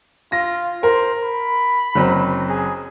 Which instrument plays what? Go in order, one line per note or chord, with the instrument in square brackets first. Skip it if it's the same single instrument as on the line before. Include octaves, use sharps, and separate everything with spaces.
[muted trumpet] F4 [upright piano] A#6
[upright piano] A#4 [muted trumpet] C5
[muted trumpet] B5
[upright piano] F#1 F#3 C4
[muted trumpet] G#4